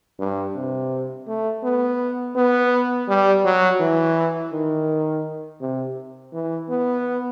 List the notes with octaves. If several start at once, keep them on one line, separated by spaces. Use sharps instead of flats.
G2
C3
A3
B3
B3
G3
F#3
E3
D#3
C3
E3
B3